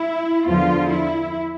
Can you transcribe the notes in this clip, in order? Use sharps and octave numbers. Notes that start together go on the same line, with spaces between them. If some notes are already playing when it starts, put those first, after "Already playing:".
Already playing: E4
E2 D3 F3 F4
E4